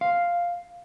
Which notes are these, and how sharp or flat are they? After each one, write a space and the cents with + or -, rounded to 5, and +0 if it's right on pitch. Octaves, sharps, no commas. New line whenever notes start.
F5 +0 C6 +0